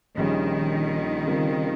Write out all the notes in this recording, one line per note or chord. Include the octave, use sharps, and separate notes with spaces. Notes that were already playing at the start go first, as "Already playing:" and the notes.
A#1 A#2 D#3 G3 C#4 G#4
C#3 G3 C4 F4 A#4